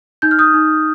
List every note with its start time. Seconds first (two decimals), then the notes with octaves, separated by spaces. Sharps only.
0.22 D#4 G6
0.31 F6
0.39 D#6 G6
0.54 D#4